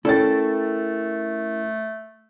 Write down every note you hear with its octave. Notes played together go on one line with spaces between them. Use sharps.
A3 C#4 E4 A4 A#4 C#5 G5 A6